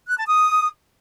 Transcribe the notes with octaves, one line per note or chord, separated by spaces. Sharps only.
F#6
A5
D#6